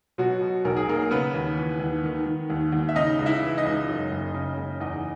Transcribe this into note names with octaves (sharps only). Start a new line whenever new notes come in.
B2 F#3 F#4
B2
B1 A#4
G#4
B1 A#3 A#4
C#3 B3 B4
D#2
E3
D#2
D#3
D#3
D#2
D#2
E5
C#3 D#4 D#5
C#2
E4 E5
E3
D#4 D#5
C#2
F#2
F#1
C#3
F#1
E2 D#4 D#5